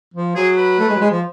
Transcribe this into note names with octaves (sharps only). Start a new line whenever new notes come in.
F3
F#3 G#4
B4
A3
G#3
F#3
G#3
F3